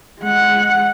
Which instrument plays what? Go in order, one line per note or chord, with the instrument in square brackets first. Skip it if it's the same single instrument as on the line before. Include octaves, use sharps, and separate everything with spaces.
[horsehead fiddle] G#3 F#5